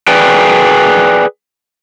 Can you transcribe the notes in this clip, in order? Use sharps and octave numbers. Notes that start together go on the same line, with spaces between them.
G#4 B4 D5 G5 G#5